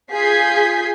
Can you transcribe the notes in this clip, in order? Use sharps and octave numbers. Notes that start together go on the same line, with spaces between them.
F4 G#4 G6 G#6 B6 C7